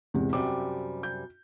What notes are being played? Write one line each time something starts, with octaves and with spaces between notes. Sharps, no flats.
E2 G#2 C3
F#2 C3 G3 D6
G6